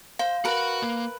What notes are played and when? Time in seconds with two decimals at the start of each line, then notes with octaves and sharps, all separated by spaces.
0.19 C5 F5
0.45 F#4 A#4 B4 F#5
0.82 A#3